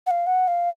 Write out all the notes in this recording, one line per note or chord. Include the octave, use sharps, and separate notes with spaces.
F#5
F5
F#5
F5